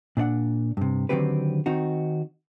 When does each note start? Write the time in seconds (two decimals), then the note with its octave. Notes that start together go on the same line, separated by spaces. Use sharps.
0.17 A#2 D4 D5 F#5
0.77 G2 C3
1.09 D3 D#3 F#3 C4 G4 B4
1.66 D#3 C4 D#4 F#4